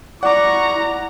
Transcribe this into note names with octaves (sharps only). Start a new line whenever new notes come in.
E4 D5 F#5 A#5 C#6 D6